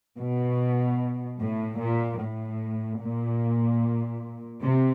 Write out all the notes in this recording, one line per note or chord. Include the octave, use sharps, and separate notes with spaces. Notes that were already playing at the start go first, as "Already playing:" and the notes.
B2
A2
A#2
A2
A#2
C3